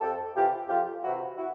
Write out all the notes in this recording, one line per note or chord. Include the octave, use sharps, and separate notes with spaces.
F2 G4 A4
C3 E3 F4 G4
F2 F4 G4
C3 E3 E4 F#4
E4 F#4